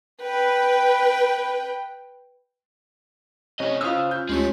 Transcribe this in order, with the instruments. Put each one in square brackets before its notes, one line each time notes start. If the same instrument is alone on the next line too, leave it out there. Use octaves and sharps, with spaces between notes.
[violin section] B4 G5
[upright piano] C2 C#4 [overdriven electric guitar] A3 D#5
[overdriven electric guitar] C#3 C#4 [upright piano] F4 D#6 E6 [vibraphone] C5 F5
[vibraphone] F4 [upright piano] G6
[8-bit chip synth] D2 C#4 F4 [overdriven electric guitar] G#3 A3 [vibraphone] G4 C#5